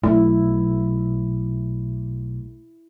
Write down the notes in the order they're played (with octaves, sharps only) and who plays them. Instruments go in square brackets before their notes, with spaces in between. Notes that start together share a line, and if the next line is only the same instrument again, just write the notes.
[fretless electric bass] B1 [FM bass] A3 [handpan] E4